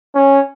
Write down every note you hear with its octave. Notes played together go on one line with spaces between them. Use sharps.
C#4